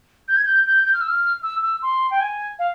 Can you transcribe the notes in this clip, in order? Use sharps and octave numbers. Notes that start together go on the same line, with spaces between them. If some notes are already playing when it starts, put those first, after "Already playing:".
G6
G#6
G6
G6
G6
F6
E6
F6
E6
E6
C6
G5
G#5
F5